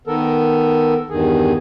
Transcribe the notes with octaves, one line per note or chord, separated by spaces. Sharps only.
D#3 B3 A4 A#4
E2 G2 D#3 G#4